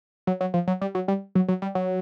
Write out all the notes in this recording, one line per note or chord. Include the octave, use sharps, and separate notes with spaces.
F#3
F#3
F3
F#3
G3
F#3
G3
F#3
F#3
G3
F#3